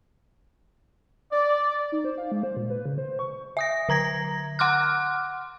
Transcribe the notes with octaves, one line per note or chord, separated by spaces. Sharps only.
D5
D#4
C5
F5
G#3
C5
A#2
B4
C#3
C5
C#6
E5 D#6 A#6
D3 A#5 G#6 A#6
F#5 C6 D6 F6 F#6